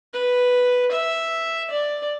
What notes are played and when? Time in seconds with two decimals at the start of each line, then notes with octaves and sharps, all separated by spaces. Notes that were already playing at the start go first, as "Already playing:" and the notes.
0.13 B4
0.92 E5
1.70 D5